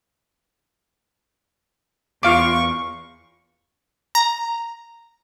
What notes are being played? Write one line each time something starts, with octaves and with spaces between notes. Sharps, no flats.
E2 F4 F5 C#6 D6
A#5